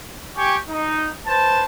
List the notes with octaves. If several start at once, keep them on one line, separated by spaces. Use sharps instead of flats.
G4 G5 G#5 C#6
D#4
B4 C5 A5